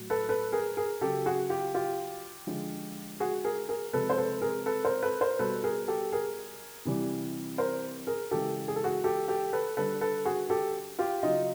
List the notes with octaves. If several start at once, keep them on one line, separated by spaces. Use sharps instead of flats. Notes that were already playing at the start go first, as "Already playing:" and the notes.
Already playing: A2 F#3
A4 B4
A4 B4
G#4 A#4
G#4 A#4
C#3 F#3 G4 A4
F#4 G#4
F4 G4
F4 G4
D3 F3 G#3
F#4 G#4
G#4 A#4
G#4 A#4
C3 F3 G#3 A4 B4
C5
A4 B4
G#4 A#4
A4 B4
A#4 C5
A4 B4
A#4 C5
B2 G3 A4 B4
G#4 A#4
G4 A4
G#4 A#4
C3 E3 G3
A#4 C5
G#4 A#4
C#3 E3 G#3 G4 A4
G#4
A4
F#4 G#4
G4 A4
G4 A4
A4 B4
D3 G3 A4 B4
A4 B4
F#4 G#4
G4 A4
F4 G4
C#3 F#3 D#4 F4